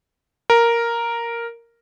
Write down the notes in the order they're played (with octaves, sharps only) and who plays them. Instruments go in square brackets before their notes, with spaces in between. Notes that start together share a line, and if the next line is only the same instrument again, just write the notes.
[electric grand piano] A#4